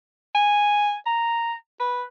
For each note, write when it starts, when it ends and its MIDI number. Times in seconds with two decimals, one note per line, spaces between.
0.35 0.95 80
1.06 1.54 82
1.80 2.04 71